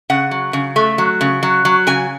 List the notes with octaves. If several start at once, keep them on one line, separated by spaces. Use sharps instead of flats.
C#3 F#5
F#3
C#3
A3
F#3
C#3
F#3
F#3
C#3 G#5